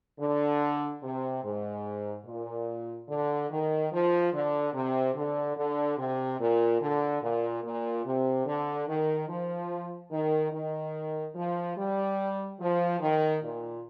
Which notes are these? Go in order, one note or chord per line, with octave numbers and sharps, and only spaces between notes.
D3
C3
G#2
A#2
D3
D#3
F3
D3
C3
D3
D3
C3
A#2
D3
A#2
A#2
C3
D3
D#3
F3
D#3
D#3
F3
G3
F3
D#3
A#2